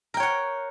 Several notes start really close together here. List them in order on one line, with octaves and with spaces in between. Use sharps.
A#4 G5 C#5 F#5